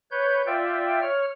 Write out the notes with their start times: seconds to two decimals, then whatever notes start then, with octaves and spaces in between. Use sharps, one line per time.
0.11 B4 C#5 G6
0.46 F4 D5 E5 G5
1.02 C#5 F6